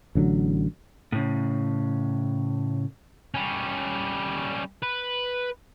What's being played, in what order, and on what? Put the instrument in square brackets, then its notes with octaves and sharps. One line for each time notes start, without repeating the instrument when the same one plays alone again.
[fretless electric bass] A1 D3 F3 F#3
[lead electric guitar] A2 C#3
[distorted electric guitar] G3 C#4
B4